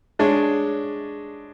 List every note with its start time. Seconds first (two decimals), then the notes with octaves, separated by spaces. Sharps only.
0.19 G#3 D4 G#4 C#5